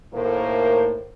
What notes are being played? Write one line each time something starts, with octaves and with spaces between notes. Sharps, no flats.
D#2 A2 A3 A#3 A#4 C5